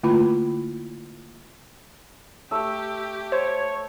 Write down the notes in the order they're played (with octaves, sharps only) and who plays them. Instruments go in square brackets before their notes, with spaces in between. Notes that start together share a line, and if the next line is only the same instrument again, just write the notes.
[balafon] D3 A3 A#3 E4 F4 B5
[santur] A3 E6 [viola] G4
[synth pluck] C5 [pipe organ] C#5